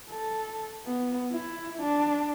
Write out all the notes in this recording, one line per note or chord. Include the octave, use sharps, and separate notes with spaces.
A4
B3
E4
D4